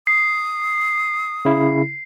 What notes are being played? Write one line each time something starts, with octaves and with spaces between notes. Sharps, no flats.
D#6 C7
C#3 E4